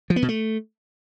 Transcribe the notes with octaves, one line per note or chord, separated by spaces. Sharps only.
F3
B3
B2
A3